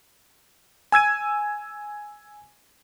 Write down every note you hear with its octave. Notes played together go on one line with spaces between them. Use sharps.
G#5 E6 G#6 D#7